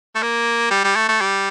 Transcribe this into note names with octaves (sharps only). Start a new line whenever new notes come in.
A3
A#3
G3
G3
A3
A3
G3